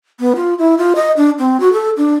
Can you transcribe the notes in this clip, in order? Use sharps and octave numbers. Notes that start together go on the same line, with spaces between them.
B3
F4
E4
F4
D#5
D4
C4
F#4
A4
D4